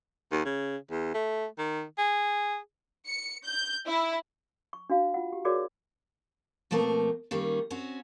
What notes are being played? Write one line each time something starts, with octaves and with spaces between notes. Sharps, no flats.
D#2
C#3
E2
A3
D#3
G#4
C#7
G6
E4
C#6
D4 F#4 F5
F4 F#5
G4
F#4 G#4 A#4 C#5 D5 D6
B2 F3 A3 A#3 C4 A#4
D#3 G3 A#3 C#4
C4 C#4 F#4